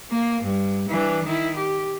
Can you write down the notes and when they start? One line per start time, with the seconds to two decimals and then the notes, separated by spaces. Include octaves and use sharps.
0.11 A#3
0.43 G2
0.89 E3 D4
1.24 D#3 E4
1.56 G4